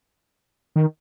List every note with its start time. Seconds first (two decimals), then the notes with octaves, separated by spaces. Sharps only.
0.76 D#3